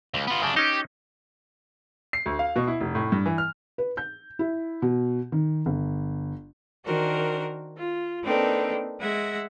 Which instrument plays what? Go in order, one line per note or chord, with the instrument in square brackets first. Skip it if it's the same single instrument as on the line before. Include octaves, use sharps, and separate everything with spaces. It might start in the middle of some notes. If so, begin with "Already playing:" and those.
[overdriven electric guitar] C#2
B3 F4
[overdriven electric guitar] F#2 D4 [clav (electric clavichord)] C#3
[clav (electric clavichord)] C#4 D#4 [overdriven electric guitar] G4
[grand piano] C7
D2
F5
B2
E4
F1
A2
G2
E3
F6
[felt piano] B4
G6
E4
B2
D#3
G1
[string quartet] D#3 D4 F#4 A#4 C5
F4
A#3 C4 D4 D#4 A4 B4
G#3 E5 F#5 G#6 A#6